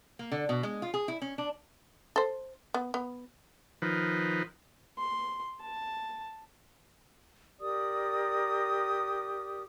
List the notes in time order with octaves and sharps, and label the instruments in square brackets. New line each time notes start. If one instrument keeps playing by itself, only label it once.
[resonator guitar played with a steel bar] A#3
D3
B2
G#3
F4
G#4
E4
C#4
D4
[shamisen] A4 C5
B3
B3
[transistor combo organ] D#3 F3 B4
[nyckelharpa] C6
A5
[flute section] G4 A#4 D5 D#6